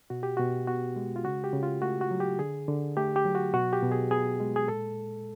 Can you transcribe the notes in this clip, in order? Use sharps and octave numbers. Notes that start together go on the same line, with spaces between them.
B2 F#4
G4
B2 F#4
B3 F#4
G#3
F4
C#3 F#4
G4
C#3
F4
A3 F#4
F#4
F#3
G4
D3 G#4
D3
A3 G4
G4
F#3
F#4
B2 F#4
G4
B2
G#4
B3 G#4
G#3
G#4
A#2 A4